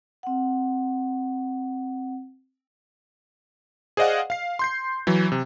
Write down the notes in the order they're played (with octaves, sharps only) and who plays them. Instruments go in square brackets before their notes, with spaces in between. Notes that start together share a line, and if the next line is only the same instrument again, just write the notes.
[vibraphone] C4 F#5
[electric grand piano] G#4 C5 D5 D#5 F5 F#5
F5 C7
C6 G6 C7
E3 F#3
C3